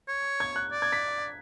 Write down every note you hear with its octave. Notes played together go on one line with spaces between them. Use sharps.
C#5
G#6
F#6
D5
G#6
B6